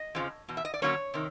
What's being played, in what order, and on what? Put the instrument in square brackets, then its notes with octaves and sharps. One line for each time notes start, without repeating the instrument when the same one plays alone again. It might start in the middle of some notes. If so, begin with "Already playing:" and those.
Already playing: [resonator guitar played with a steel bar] D#5
F2 C#3 F3
E2 B2
E5
D#5
D5
D3 F#3 A#3 C#4 C#5
C3 D#3